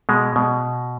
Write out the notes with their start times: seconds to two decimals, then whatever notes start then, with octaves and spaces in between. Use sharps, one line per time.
0.09 B2 G#3
0.36 B2